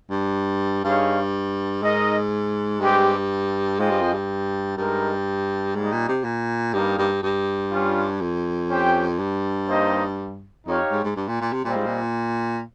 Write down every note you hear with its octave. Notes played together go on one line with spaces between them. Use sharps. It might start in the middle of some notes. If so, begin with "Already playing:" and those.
G2
G2 D#4 G#4 C#5 F5
G#2 D#4 A#4 D#5
G2 G#3 C4 G4
G#2 F4 G#4 C5 D#5 G5
G2
F2
G2
G2 G#3 D#4 A#4
G#2 G3 A#3 D#4
A#2
C3
A#2
G2 G3 A#3 D#4
G2
G2
G3 C#4 F4
F2
C#4 G4 C5 G5
G2
A#3 D#4 G4 C5 D#5
F2 D#4 G4 C#5 F5
G#2
G#2
G2
A#2
A#2
C3
A#2 G3 C4 F4 C5 D#5
G#2
A#2